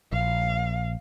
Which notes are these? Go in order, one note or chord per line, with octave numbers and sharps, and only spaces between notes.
A#1 F5